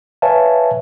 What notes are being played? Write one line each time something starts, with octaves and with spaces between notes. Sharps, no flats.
B4 C#5 E5 F5 G#5 A5